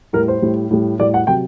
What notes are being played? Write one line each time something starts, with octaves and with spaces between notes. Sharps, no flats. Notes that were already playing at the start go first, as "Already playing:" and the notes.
A2 G3 A#4
C5
A2 G3
A2 G3
A2 G3 D5
F#5
C3 F#3 G5